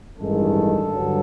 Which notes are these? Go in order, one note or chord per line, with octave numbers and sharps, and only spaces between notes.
A1 G2 D#3 G#3 A4
G2 D3 F#3